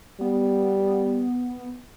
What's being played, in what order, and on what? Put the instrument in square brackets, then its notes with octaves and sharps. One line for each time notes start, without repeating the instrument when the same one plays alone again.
[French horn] G3 [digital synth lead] B3